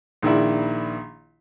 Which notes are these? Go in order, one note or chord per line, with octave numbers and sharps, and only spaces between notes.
A#1 D#3 D4 E4